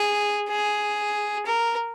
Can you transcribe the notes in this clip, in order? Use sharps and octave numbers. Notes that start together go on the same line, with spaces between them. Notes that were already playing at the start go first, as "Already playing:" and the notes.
Already playing: G#4
G#4
A#4